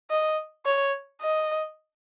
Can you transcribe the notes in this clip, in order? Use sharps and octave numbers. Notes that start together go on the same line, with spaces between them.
D#5
C#5
D#5